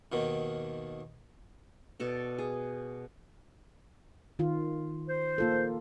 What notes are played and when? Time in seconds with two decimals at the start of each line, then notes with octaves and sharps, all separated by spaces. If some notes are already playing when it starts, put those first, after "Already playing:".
0.12 D#2 B2 D#3
2.00 B2 A4 D5
2.38 G#4
4.39 D#3 F4
5.08 C5
5.38 A#3 F4 A4